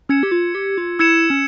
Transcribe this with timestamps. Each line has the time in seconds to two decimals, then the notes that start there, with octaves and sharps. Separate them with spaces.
0.09 C#4 E6 G#6 C#7 E7
0.23 G4
0.32 F4
0.55 G4
0.78 F4
0.99 E4 E6 G#6 C#7 E7
1.30 C#4